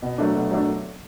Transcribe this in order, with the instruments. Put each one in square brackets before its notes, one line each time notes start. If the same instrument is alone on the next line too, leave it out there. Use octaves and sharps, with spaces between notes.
[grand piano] B2
F#3 A3 D4
B2
F#3 A3 D4